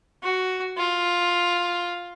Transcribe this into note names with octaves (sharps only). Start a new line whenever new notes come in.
F#4
F4